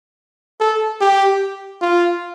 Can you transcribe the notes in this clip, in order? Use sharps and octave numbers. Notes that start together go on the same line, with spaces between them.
A4
G4
F4